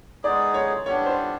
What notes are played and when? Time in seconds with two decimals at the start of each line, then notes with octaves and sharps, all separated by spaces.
0.24 G#3 B3 D#4 G#4 D5
0.54 C#5
0.86 G3 B3 D4 C#5
1.06 C5